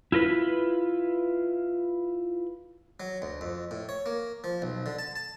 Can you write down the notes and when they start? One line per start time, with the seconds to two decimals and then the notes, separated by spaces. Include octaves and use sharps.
0.12 E4 F4 A#4 B4
3.00 F#3
3.22 D2
3.41 F2
3.71 A2
3.89 C#5
4.06 A#3
4.44 F3
4.62 B1
4.86 D3
4.99 A5
5.16 A5